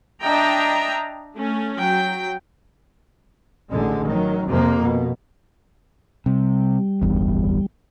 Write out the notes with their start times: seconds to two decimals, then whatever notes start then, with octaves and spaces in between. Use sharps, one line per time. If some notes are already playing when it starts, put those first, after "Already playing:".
0.23 D4 D#5 E5 G5 A#5
1.35 A3 C#4
1.79 F#3 G5
3.70 A1 D3 G#3
4.08 D#3 F#3
4.49 F2 C3 A#3
4.82 B2
6.26 C3 G3
7.02 D1 G1 E2